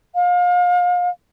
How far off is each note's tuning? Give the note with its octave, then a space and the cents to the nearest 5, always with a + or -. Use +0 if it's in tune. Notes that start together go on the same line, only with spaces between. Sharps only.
F5 +35